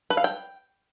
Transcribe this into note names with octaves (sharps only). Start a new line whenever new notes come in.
B4
F5
G5